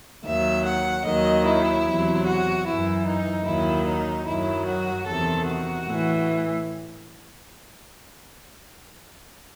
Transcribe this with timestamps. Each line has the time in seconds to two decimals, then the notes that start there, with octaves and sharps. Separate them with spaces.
0.24 D#2 D#3 F#3 E5
0.65 F#5
1.05 D#2 D#3 F#3 D#5
1.46 E4
1.85 E2 C3 F#3
2.25 F#4
2.66 F#2 E3 E4
3.06 D#4
3.46 D#2 D#3 F#3 E4
3.86 D#4
4.27 F#2 D#3 F#3 E4
4.66 F#4
5.07 E2 C3 D#3 A4
5.46 F#4
5.87 A2 E3